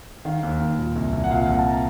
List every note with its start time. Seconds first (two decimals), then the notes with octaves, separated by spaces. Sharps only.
0.25 D#3 F5
0.43 D#2
0.60 D#2
0.78 A#2
0.96 C2
1.13 C2
1.24 F#5
1.30 A#2 F5
1.46 C2 F#5
1.59 A5
1.71 A#5